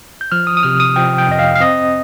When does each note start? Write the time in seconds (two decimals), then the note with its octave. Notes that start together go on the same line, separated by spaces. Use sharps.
0.21 G6
0.32 F3 F6
0.47 D#6
0.57 D#6
0.63 C3 F6
0.80 D#6
0.96 F3 G5
1.18 G5
1.28 F2 D#5
1.39 F5
1.55 F5
1.60 C4 D#5